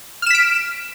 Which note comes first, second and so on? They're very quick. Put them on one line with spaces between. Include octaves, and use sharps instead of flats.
F6 E7 B6 D7